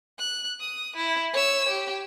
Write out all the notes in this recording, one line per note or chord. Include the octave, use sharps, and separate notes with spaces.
F#6
D#6
E4
C#5 E6
G4